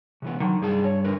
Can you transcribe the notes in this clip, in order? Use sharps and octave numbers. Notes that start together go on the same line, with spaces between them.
C3 E3 B3
D3 D#3 F#3
C2 G2 G#4 A5
C#5
D3 A#4 B4